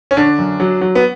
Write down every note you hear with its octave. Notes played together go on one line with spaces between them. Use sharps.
C#4
D3 D4
F#2
F#3
F#3
B3